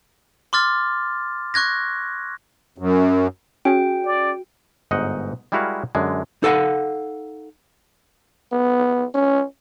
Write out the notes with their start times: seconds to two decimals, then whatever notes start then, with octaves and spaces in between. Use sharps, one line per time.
0.53 C6 D6 F6 A6
1.54 C#6 F#6 G#6 A#6
2.78 F#2
3.65 C#4 F#4 G#4 G5
4.06 D5
4.91 G1 G#2 D#4 D#5 F#5
5.52 G3 G#3 E4 F#4 A#4 F5
5.95 F#2 D3 G#3
6.43 D#4 A4 F5 F#5
8.52 B3
9.14 C#4